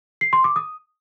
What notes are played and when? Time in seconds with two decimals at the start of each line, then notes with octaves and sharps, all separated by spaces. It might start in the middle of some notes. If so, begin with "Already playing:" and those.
0.21 C7
0.33 C6
0.44 D6
0.56 D#6